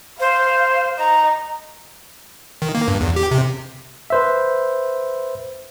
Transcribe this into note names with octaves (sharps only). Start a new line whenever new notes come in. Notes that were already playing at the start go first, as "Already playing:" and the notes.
C5 F5
D#4 A#5
D#3
A#3
G2
E2
G4
C3
B4 C5 E5